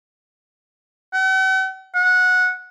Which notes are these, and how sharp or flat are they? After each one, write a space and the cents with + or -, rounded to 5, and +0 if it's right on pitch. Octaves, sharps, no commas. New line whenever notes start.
F#5 +45
F#5 -15